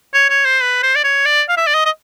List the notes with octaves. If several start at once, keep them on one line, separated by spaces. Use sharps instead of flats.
C#5
C#5
C5
B4
C5
D5
C#5
D5
F5
E5
D5
D#5
D#5